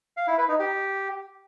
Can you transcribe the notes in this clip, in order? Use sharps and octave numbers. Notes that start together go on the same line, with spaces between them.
F5
E4
B4
D#4
G4